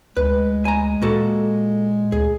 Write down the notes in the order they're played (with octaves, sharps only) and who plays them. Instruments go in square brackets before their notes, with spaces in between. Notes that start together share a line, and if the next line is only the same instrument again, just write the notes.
[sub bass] D2 [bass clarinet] G#3 [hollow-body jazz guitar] B4
[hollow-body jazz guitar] G#5 A#5
[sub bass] A#2 [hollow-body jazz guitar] A#3 F#4 A4
[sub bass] D2 [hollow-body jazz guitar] G#4